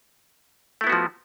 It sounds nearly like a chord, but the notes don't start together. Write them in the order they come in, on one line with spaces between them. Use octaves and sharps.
A3 E4 B3 F#4 F3